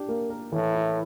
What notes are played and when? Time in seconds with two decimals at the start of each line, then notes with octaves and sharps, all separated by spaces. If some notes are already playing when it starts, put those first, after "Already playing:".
Already playing: D4 G4
0.09 A#3
0.30 A#4
0.52 A2 E3
0.75 E4